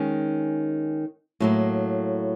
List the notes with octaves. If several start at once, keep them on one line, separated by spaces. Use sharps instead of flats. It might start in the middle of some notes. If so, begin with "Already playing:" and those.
Already playing: D#3 G#3 C#4
A2 F#3 A#3